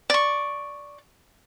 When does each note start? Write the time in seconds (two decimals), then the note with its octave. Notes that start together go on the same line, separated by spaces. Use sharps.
0.10 D5 C#6